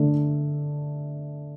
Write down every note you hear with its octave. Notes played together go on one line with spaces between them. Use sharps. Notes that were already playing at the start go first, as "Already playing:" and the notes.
Already playing: D3 A3 D4